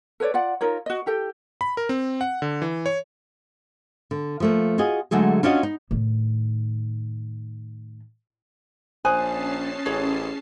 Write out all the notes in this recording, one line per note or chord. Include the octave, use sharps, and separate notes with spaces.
A4 B4 C#5 D5
F4 D5 F#5
D#4 F4 A#4 C#5
F#4 D#5
E4 G4 A4 G5
B5
A#4
C4
F#5
D3
E3
C#5
D3
F3 A3 A#3
F4 F#4 G#4 D#5
D3 F#3 G#3 A3 G#4
C#4 D4 F4 F#4 D#5
D#4
A2 D#3
A#1 C#4 C5 G#5 A5 D#6 F#6 C7
A1 G#4 C#5